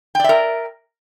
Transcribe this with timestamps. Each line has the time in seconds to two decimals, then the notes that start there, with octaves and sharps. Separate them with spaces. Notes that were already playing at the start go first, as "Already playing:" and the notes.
0.15 G5
0.20 D5
0.24 E5
0.29 A#4